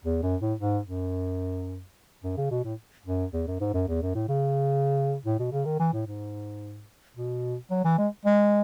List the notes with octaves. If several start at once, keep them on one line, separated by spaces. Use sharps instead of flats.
E2
F#2
A2
G#2
F#2
F#2
C#3
B2
A2
F#2
E2
F#2
G#2
F#2
E2
F#2
A2
C#3
A2
B2
C#3
D#3
E3
A2
G#2
B2
F#3
E3
G#3
G#3